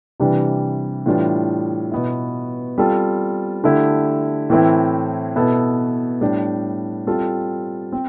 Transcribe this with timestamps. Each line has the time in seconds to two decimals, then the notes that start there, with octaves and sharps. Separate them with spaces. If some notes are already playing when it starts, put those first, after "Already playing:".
0.20 C3 E3 G3 D4
1.06 A2 E3 G3 D4 F4
1.92 B2 B3 E4
2.78 G3 C4 F4 A4
3.64 D3 A3 E4 G4
4.50 A2 E3 A3 C4 E4
5.36 B2 B3 E4 A4
6.21 A2 G3 D4 G4
7.07 G3 C4 F4 A4
7.92 C4